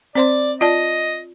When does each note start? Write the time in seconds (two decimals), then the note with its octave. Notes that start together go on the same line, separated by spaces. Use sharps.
0.15 C4 C5 D5 C6
0.61 F4 D5 D#5 A5